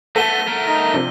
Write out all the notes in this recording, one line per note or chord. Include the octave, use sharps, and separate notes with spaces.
A3 B3 A4 F#5 A5 A#6 D#7 G7
A3 A#4
D#4 A#6
C3 F3 D4